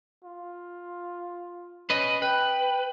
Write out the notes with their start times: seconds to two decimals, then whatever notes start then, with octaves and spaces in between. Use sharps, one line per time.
0.25 F4
1.90 C#4 B4 D#5
2.22 B4 G5